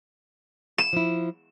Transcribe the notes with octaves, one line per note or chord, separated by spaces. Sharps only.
E7
F3 E4